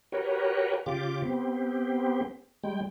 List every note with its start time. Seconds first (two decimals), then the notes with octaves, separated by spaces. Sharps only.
0.12 F#4 G4 A#4 B4 C#5
0.86 C#3 F4 G4 D6
1.22 B3 C4 G4
2.63 G3 G#3 G5